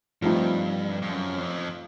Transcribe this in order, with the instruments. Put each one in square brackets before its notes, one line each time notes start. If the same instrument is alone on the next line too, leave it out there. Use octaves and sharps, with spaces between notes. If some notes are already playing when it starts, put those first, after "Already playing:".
[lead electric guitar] G2 [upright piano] F3 A3 C4 D#4
[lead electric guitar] G2
F#2
F2